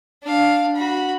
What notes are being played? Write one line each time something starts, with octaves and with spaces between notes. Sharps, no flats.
D4 F5
F#4 B5